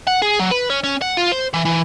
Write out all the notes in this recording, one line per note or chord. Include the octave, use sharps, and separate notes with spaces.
F#5
G#4
F#3
B4
C#4
C#4
F#5
F4
C5
E3
E3